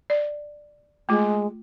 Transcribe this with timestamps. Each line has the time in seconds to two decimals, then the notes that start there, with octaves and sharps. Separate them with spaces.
0.10 D5
1.09 G#3 A3 F4